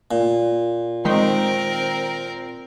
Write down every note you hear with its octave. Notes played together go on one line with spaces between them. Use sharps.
A#2
D#3 G#3 C4 D#4 A#4